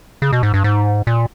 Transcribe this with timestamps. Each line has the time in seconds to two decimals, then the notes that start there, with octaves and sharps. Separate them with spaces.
0.22 C#3
0.33 B2
0.43 G#2
0.54 G2
0.64 G#2
1.07 A#2